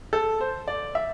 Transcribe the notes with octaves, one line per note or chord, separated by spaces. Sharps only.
A4
C5
D5
E5